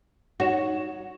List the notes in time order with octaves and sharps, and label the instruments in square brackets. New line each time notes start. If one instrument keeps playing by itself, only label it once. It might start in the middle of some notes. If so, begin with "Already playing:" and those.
[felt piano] D#4 C#5 E7 [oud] F#4